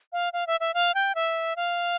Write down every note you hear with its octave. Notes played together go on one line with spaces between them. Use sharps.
F5
F5
E5
E5
F5
G5
E5
F5